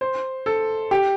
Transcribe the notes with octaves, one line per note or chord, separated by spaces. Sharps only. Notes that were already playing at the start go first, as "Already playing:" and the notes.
C5
A4
G4